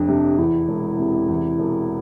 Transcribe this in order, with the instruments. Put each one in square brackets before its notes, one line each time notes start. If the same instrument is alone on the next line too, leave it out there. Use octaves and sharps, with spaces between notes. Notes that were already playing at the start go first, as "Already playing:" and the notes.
Already playing: [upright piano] F1 F2 [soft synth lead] D4
[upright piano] C3
[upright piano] E2 [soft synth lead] E4
[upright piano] E1
C3
E2
E1